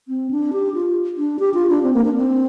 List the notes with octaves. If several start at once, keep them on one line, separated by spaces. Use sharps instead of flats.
C4
D4
G4
F4
D4
G4
F4
D4
C4
A#3
D4
C4